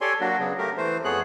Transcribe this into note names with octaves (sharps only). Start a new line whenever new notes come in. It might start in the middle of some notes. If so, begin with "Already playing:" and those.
G4 A4 C#5 D5 G#5 C6
F#3 A#3 D4 F#4
C#3 F#3 B3
A3 G4 A#4
E3 A3 C5
F2 A3 B3 G#4 C#5 F#6